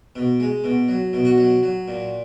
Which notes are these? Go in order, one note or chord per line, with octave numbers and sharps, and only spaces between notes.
B2
G#3
B2
F#3
B2
F#4
F#3
F#3
A#2